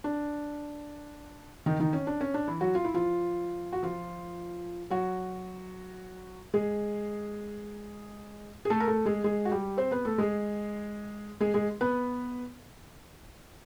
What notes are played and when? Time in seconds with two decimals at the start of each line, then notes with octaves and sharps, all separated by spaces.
0.04 D4
1.66 D#3 D#4
1.80 D#3 D#4
1.93 C#4
2.07 D4
2.21 C#4
2.34 D4
2.47 E3 E4
2.61 F#3 F#4
2.75 F4
2.85 E4
2.94 F3 F4
3.73 F#4
3.83 F3 F4
4.90 F#3 F#4
6.54 G#3 G#4
8.65 G#4
8.70 A3 A4
8.80 A#4
8.88 A3 A4
9.06 G#3 G#4
9.24 G#3 G#4
9.45 F#4
9.51 G3 G4
9.77 C4 C5
9.91 B3 B4
10.05 A3 A4
10.18 G#3 G#4
11.40 G#3 G#4
11.54 G#3 G#4
11.81 B3 B4